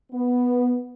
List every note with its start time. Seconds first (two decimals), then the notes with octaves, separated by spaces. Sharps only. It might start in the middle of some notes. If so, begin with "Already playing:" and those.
0.12 B3